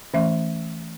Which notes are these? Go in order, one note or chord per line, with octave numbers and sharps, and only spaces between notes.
E3 A3 C#4 E5